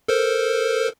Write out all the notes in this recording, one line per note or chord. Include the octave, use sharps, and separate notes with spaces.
A4 A#4 C5